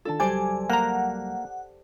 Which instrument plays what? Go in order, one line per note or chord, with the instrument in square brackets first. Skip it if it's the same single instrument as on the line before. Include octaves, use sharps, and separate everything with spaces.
[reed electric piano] D#3 D4 F4 [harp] A4 A5
[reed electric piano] C#2 F#3 G3 [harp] G4 C5 D5 [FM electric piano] G#5
[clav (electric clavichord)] A#3 A#5 [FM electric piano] F#5